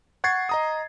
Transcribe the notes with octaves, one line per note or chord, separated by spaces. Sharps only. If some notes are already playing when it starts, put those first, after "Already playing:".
F#5 C#6 G#6 A6 C7
D#5 A#5 D#6